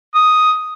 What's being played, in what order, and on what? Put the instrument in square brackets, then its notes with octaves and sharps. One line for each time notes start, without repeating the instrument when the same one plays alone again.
[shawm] D#6